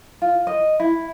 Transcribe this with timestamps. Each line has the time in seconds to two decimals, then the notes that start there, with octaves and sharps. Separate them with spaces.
0.22 F4
0.47 D#5
0.80 E4